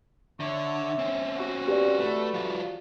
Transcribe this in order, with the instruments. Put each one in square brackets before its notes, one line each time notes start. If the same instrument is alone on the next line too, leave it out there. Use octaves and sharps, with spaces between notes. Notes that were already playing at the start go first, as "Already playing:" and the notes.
[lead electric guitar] D3 [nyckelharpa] C#5 [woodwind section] E5
[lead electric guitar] C4 C#4
[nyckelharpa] F#4
[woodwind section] G2 [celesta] G4 D5
[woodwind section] D3 E3 B4 [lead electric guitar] A3
[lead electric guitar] F#3 F4